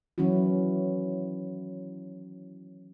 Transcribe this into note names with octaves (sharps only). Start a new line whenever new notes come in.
D#3 E3 F#3 C#4 E4 F#4